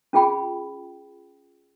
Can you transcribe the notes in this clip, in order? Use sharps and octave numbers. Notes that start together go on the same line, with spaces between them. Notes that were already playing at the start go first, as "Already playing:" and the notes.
C#4 F4 G#4 G5 B5